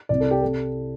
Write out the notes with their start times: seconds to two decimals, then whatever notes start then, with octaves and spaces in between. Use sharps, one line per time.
0.09 C2 C3 D5
0.20 A4
0.31 G4
0.42 C3 A4